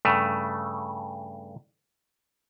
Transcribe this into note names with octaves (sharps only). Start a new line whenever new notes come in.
G2 C#3 A3